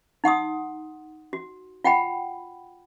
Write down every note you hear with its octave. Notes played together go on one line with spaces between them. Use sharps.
D#4 F#5 C6 D#6
F#4
F4 F#5 G5 B5